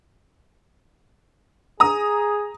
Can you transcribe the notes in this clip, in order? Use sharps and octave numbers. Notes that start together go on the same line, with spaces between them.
G#4 A#5 D#6